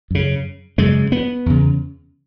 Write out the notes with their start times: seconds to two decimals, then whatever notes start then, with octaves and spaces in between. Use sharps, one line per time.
0.11 F#2 C#3
0.78 F#2 C#3 G#3
1.12 B3
1.46 E2 C#3